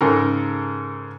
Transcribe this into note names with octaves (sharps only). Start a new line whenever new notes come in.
G#2 C#3 A4 A#4